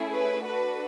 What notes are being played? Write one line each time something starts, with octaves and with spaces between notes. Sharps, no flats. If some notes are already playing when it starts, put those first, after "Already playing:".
Already playing: A3 C#4 E4 G#4
B4
D4 F#4 A4 B4